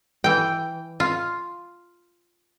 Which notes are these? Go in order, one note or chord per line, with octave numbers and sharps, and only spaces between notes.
E3 G5
F4